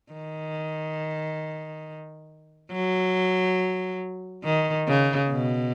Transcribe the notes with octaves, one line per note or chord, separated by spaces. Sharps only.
D#3
F#3
D#3
C#3
B2